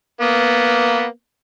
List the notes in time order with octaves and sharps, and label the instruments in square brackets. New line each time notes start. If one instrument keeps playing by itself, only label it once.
[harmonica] A#3 B3